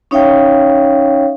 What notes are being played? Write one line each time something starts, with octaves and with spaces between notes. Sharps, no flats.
C#4 D#4 C#5 E5 F5 G5